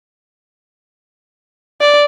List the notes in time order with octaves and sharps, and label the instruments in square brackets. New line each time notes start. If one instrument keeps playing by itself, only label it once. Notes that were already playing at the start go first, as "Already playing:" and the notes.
[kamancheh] D5